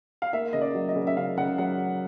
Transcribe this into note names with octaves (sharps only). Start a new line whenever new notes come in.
F5
A#3 E5
C#3 D#5
D5
F#3
D#5
C#3
E5
C#3 F5
C#3 F#5
F#3 F#5